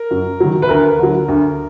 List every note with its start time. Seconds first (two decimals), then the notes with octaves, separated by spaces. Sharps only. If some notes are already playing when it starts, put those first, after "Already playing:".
Already playing: A#4
0.11 F#2
0.40 D#3 F#3
0.62 B4
0.69 D2 A#4
0.99 D3 F#3
1.28 D2